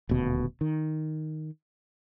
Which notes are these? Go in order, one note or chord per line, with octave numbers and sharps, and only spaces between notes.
D#1 D2 B2
D#3